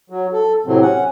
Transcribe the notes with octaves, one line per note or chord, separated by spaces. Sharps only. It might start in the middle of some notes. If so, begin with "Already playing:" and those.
F#3
A4
A2 C3 F#3 C4
C#4 F#5